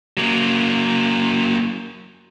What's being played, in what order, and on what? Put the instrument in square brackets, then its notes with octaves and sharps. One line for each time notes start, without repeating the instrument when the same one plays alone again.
[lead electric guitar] F#3 A#3